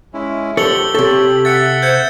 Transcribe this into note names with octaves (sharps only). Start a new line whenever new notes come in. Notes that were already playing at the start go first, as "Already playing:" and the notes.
G#3 C#4 E4
D3 F3 G4 A4 C#5 E6 F#7 G7
C3 A4 C#5
E5 F#5 A6 C#7
C5 G6 G#6 C#7